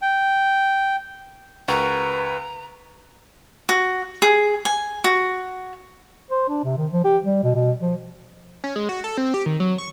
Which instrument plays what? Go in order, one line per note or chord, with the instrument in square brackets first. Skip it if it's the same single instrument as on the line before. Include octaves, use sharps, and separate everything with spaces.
[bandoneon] G5
[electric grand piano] C#2 A#4 [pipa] F#4 [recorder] B4 [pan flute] A#5
[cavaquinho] F#4
G#4
G#5
F#4
[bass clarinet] C5
D4
C3
D#3
F3
G4
G3
B2
B2
F3
[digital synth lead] C#4
G#3
F#4
A4
C4
G4
D#3
F#3
C#6